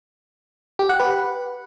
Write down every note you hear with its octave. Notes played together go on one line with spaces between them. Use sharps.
G4
F#5
B4